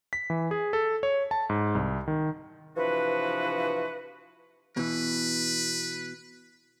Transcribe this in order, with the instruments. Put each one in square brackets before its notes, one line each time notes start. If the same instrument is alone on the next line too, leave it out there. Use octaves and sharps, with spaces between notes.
[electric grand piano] B6
E3
G#4
A4
C#5
A5
G#2
C2
D#3
[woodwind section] C3 E3 F3 D4 F#4 B4
[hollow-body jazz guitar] B2 E3 [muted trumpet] B4